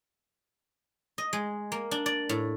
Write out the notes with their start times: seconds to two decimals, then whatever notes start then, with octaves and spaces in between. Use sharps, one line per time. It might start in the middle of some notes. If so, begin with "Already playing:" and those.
1.18 D#5
1.33 G#3
1.72 A#3
1.91 D4
2.06 D5
2.29 A2